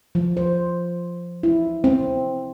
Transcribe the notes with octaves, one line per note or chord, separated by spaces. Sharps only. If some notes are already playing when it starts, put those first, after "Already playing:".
F3
C5
E4
C4